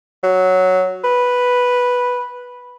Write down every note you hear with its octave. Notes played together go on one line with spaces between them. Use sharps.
F#3
B4